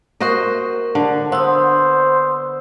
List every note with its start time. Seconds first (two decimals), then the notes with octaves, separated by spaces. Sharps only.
0.21 A#3 F#4 A#4 C5 D#5
0.95 D3
1.32 B3 C5 D#6 E6